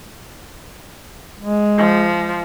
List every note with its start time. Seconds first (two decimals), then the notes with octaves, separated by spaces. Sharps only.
1.40 G#3
1.78 F3